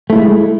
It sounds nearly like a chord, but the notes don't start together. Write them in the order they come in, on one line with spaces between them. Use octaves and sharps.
A3 E4 G#3